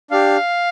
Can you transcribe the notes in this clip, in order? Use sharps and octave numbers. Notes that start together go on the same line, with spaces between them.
D4 G4 F5